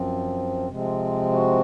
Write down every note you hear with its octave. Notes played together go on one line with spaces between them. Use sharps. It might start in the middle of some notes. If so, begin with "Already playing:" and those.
Already playing: F#2 F3 C4
C3 F3 G#3 C4
F#4